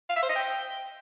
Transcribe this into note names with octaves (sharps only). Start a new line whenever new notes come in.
F5
E5
C5
D#5
G5